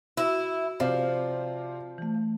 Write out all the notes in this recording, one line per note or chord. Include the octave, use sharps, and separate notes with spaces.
E4 F#4
C3 F3 D5 F5
E3 A3